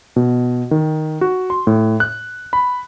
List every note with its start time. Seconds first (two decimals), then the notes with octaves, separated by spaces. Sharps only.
0.16 B2
0.71 D#3
1.21 F#4
1.50 C6
1.67 A2
2.00 F#6
2.53 B5